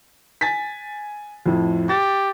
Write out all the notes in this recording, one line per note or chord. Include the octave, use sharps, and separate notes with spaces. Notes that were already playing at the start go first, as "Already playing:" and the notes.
G#5 A6 B6
F2 A2
G4 A6